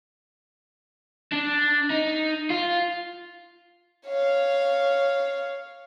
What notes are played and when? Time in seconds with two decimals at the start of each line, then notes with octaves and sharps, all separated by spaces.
1.32 D4
1.90 D#4
2.51 F4
4.07 C#5 F5